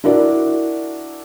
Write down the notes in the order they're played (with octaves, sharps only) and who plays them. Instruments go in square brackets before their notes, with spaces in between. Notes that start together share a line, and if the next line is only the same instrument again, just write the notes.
[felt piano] D4 E4 F#4 A#4 D5